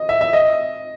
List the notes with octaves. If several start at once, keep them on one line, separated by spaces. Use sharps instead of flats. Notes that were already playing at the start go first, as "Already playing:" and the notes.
Already playing: D#5
E5
E5
D#5